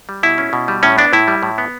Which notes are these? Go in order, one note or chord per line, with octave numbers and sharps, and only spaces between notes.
G3
B2 E4
C#4
B2
G3
A2 C#4
B3 D4
A2 E4
G3
A2
B3